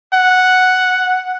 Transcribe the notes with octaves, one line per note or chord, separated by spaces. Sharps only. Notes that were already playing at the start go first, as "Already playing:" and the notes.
F#5